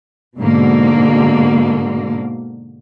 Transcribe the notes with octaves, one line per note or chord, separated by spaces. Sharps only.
G#2 B2 D3 A#3